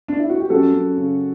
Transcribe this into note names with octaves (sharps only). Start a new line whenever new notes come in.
D4
E4
F#4
G4
F#2 F#4 A4
F#2
C#3